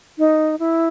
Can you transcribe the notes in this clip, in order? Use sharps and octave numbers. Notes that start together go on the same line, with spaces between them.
D#4
E4